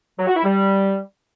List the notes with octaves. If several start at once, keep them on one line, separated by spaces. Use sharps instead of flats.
F#3
F#4
E4
G3